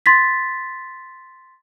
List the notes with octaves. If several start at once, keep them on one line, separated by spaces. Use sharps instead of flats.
C6 A6 B6